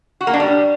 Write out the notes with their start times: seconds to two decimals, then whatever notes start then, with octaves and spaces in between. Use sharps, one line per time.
0.21 F#4
0.27 A#3
0.33 D4
0.40 G3